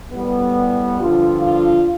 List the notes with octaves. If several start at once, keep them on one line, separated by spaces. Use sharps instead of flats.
A2 G3 B3
G2 D3 F3 F4
F4